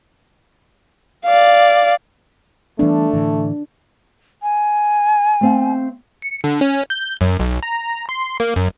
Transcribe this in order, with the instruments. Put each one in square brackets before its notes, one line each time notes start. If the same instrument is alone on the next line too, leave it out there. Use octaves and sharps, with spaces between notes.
[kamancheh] D5 F5
[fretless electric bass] E3 G3 B3 [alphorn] A3 [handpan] D4
[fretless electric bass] A2 D3 E3
[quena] G#5
[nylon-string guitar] A3 C4 F5
[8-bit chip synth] C#7
D3
C#4
G6
F#2
B1
A#5
C6
A#3
F#2